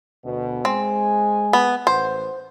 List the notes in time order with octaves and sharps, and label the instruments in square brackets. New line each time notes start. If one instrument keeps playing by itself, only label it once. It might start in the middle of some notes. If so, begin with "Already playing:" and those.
[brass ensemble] D2 B2
[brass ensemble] G#3 G#5 [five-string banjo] C4
[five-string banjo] B3
[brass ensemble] A1 B4 F#5 [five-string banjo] C5